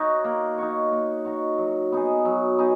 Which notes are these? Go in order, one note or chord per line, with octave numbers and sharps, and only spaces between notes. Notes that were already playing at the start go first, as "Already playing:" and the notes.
Already playing: D#4 F#4 C#5
A#3
D#4 F#4 C#5
A#3
D#4 F#4 C#5
F#3
B3 D#4 G#4
F#3
B3 D#4 G#4